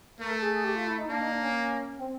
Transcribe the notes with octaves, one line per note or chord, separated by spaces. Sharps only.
A3 A#4
A4
G#4
G#4
G4
F4
E4
D#4
A#3 D4
D#4
D4
C#4
C4